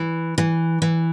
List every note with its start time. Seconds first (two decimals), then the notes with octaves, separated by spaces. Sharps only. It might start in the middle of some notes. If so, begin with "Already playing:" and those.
Already playing: E3
0.38 E3
0.82 E3